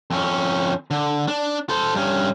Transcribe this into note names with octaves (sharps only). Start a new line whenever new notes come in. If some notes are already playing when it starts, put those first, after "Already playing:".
F2 C#4
D3
D4
A4 C5
G2 C#4